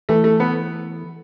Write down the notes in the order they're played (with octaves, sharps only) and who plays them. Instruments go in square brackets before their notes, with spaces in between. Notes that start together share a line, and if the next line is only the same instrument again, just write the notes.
[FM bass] E3 [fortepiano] A3
[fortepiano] A3
B3